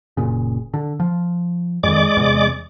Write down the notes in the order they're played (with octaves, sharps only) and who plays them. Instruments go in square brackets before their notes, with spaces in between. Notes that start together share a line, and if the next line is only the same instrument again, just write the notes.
[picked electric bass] F#1 A#2 C#3
D3
F3
[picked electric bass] F2 D#3 [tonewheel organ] G#3 D5 D6
[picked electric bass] E2 C3